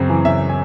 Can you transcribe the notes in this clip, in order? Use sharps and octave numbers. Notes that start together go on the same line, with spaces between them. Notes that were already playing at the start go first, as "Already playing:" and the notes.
Already playing: F#2 C#3 C4
E3
C#3 E5
G#5